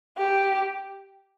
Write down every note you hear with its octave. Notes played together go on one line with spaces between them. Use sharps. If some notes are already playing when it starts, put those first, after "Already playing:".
G4